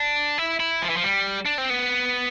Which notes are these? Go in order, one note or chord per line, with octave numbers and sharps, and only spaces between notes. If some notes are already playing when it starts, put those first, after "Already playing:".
Already playing: D4
E4
E4
F3
E3
F3
G3
D4
C4
B3